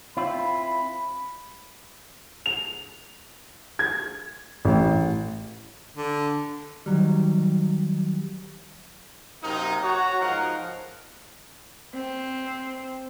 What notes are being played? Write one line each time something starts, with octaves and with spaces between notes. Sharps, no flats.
C4 E4 F4 B5
F7
G#6
A1
D3
D#3 F#3 G3
F#2 C3 A#3 D#4
F#4 C#5 A#5
G#2 F3 D#4 A#4 F5 F#5
C4